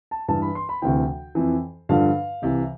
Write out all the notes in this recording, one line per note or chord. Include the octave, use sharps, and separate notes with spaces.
A5
G2 E3 A5
B5
C6
B5
D2 C3 E3 G5
F2 E3
G2 D3 F3 F5
C2 C3 E3